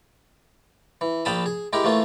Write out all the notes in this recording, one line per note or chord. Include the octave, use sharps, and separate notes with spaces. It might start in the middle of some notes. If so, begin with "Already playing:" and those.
E3
A#1 F5 G5 A5 B5 D#6
G#4
G#3 E4 G4 A#4
E3 A3 A#3 C#4 F4